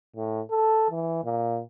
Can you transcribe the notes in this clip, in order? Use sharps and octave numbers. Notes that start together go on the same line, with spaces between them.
A2
A4
E3
A#2